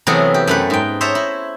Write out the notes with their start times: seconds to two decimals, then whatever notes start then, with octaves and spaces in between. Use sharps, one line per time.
0.07 C3 E3 F#3 A3 B3 G#4
0.34 G4
0.47 F#2 A3 B4
0.70 G#2 G5
1.01 C5 C#5 D#5 E5 A5 A#5
1.15 E4